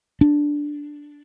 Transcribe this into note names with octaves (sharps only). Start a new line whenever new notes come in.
D4